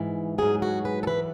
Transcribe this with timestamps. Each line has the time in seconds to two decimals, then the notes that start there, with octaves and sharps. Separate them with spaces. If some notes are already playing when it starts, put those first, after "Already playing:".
Already playing: G#2 E3
0.38 G#2 F#3 G#4
0.62 F#4
0.85 B4
1.03 A4
1.07 E3 B4